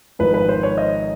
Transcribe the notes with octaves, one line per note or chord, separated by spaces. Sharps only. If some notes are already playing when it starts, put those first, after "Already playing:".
G#1 G#2 F3 B4
B4
C5
C#5
D#5